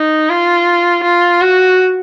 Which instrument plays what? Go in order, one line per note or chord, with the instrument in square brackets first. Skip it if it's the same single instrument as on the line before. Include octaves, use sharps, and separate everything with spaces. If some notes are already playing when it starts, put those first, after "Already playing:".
Already playing: [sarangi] D#4
F4
F4
F#4